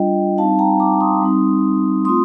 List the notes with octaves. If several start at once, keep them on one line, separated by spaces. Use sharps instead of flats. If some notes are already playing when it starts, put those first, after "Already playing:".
Already playing: G3 D4 F4 D#5 G5
G3 C4 D#4 F5 A5
G5 A#5
A#5 D6
C6 D#6
G3 C4 D#4
A3 C4 F4 C6 D#6